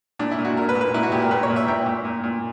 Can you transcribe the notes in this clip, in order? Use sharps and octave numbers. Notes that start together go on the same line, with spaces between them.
A#2 D4
E4
A#2
F#4
A#2 A#4
B4
A#2
B4
A#2 E4
F#4
A#2 G4
A#4
A#2 B4
C#5
A#2
E5
A#2 G5
A#2
A#2
A#2